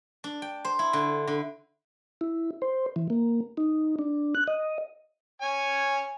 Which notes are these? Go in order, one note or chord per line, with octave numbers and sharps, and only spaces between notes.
D4
G5
C5
E4
D3
D3
E4
C5
E3
A#3
D#4
D4
F#6
D#5
C#5 G#5